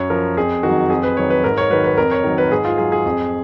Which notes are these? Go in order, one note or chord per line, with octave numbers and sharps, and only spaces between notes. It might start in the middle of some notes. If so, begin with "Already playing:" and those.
Already playing: F#2 C#5
F3 A#4
F2 G#4
D#3 F#4
F#3
F2 G#4
B4
D#3 F#3 C#5
B4
G#2 A#4
C#5
D#3 F#3 B4
B4
F2 A#4
C#5
D#3 F#3
B4
G#2 G#4
F4
F#3 G#4
G#4
F2